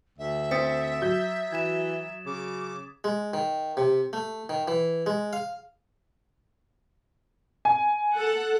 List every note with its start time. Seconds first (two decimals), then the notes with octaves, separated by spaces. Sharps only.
0.18 D2 E5
0.51 C4 D#6 A6 B6 C#7
1.02 F#3 G6
1.52 E3 G#6 E7
2.26 C#3 D6
3.04 G#3
3.34 D#3
3.77 C3
4.13 A3
4.49 D#3
4.68 E3
5.06 G#3
5.33 F5
7.65 G#5
8.14 A4 F#5